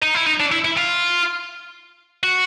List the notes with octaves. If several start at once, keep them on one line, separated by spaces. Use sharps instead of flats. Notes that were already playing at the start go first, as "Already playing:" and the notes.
D#4
E4
D#4
D4
E4
E4
F4
F#4